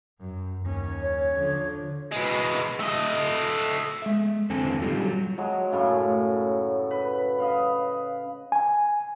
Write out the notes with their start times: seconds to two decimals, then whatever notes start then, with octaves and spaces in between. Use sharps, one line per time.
0.20 F#2
0.62 D#2 C#4
1.02 C#5
1.35 D3 F3
2.12 B2 G#3
2.80 A3 D#5
4.02 G#3 E5
4.50 E2 D3 C4 A4 G#5
4.82 G3 D#4 F4 G4 A4
5.02 F#3
5.38 F#3 G#3
5.72 F#2 A2 C#3
6.91 B4
7.38 D#5 F5 B5
8.52 G#5